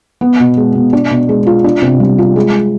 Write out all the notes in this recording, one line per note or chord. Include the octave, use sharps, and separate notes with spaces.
B3
B2
G#3
B2
D4
B2
G#3
F4
D4
C3
G3
F4
G#3